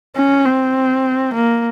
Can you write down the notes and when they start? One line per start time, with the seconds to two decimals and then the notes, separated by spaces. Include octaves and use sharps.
0.16 C#4
0.45 C4
1.34 A#3